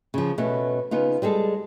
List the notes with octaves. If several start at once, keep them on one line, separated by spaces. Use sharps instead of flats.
C#3 F3
B2 A3 B3 C#4
C#3 B3 D#4 F4
G3 G#3 G#4 A4